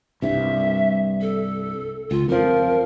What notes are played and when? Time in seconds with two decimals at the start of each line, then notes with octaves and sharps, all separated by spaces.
0.22 C2 G2 E5
1.21 A4
2.11 C#2 F4
2.29 F2 F3 A#4